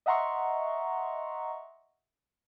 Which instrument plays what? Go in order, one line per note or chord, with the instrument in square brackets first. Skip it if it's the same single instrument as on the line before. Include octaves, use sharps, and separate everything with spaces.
[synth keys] D#5 E5 F#5 A#5 C6 C#6